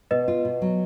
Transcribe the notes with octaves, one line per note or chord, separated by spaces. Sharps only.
B2 B4 D#5
F4
B2
F#3